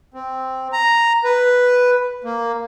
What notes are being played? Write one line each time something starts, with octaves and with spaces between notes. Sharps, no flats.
C4
A#5
B4
A#3